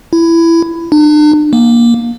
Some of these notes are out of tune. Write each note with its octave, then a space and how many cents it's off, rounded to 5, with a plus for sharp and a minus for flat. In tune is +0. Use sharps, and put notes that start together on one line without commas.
E4 +15
D4 +40
A#3 +15